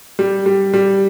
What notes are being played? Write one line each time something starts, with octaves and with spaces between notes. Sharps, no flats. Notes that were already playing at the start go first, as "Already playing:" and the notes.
G3
G3
G3